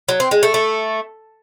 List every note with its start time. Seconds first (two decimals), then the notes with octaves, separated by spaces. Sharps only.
0.09 F#3
0.20 C4
0.31 G#3
0.43 A3
0.54 A3